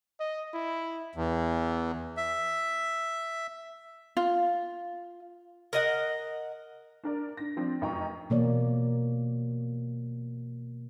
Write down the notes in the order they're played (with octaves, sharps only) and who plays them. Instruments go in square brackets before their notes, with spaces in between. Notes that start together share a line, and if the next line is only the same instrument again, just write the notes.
[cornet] D#5
E4
[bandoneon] E2
E5
[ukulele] F4
[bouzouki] A#4 D#5 F#5
[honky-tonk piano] D4 A#4 D5
D4 A#6
F3 C4 D4
F1 F#2 D#4 G5 A#5 C#6
[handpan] B2 E3 A#3 C#5 D5